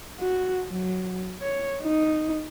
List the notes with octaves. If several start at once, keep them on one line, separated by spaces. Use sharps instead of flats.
F#4
F#3
C#5
D#4